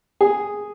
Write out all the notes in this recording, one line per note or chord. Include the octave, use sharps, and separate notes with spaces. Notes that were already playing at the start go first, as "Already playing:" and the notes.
G#4